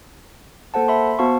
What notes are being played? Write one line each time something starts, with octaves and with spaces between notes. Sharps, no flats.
A#3 A4 C5 F#5 A5
E5 B5 C6
B3 F#4 C5 F5 A5 C#6